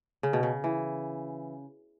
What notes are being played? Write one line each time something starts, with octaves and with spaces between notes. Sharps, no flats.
C#3
B2
C#3
E3